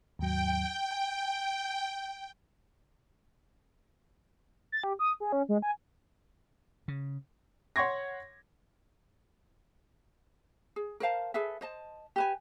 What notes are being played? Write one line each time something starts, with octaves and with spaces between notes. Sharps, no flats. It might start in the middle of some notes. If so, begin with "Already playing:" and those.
D#2 G#2 F#3 G5
G#5
A6
G4
D#6
G#4
C#4
G#3
G#5
C#3
C#5 F#5 C6 C#6 G#6 A#6
G#4
A#4 C5 F5 A5
G#4 A4 B4 E5
C5 D#5 A5
G4 B4 G#5